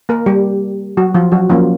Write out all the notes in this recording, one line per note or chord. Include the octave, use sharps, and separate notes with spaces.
A#3 A#4
G3 G4
F#3 F#4
F3 F4
F#3 F#4
F3 F#3 A#3 C#4 F4